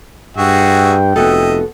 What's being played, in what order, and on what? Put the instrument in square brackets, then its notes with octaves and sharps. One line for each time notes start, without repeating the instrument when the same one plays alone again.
[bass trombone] G2 [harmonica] F#4 G#4 E5 [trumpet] G5
[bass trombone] F1 [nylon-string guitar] B3 F#4 A4 [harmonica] D#5 E5